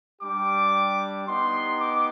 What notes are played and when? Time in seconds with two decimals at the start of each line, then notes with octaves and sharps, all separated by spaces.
0.21 G3 D4 G4 D6
1.25 B3 D#4 G4 C6
1.78 D6